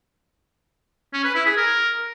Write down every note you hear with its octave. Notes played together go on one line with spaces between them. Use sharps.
C#4
B4
E4
G#4
A#4